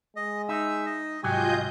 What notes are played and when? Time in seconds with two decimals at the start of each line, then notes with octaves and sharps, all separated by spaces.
0.16 G#3 D#5
0.49 D#4 E5 E6
0.86 D#5
1.23 C2 G#2 F#3 F4 G4 D#5 G#5 G6